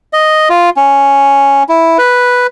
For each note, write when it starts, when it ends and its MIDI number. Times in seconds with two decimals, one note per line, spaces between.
0.13 0.49 75
0.50 0.70 65
0.77 1.63 61
1.69 1.98 64
1.98 2.47 71